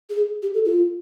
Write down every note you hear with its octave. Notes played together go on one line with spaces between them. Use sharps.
G#4
G4
A4
F4